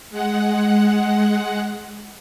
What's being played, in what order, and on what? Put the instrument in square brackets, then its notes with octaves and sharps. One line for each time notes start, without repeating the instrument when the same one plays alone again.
[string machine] G#3 F#5